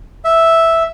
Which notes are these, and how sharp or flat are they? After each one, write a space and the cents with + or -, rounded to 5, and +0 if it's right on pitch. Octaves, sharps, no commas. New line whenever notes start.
E5 -5